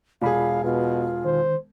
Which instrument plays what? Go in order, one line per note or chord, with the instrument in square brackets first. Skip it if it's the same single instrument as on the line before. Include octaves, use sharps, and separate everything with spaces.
[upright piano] E1 G#4 [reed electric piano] F4 D5 B5 [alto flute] F5
[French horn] B2 [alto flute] F4 [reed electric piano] B4
[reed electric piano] D#3 [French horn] C5